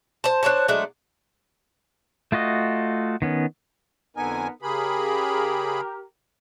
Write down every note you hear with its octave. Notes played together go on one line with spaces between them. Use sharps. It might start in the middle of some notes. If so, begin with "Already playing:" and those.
C5 A5
D4 C5 C#5 A5
F#3 G#3 A3 D4
A3 F4 F#4 D#5
D#3 B3 C#4
F2 D3 B3 D#4 A#4 G#5
C#3 G4 G#4 A#4 B5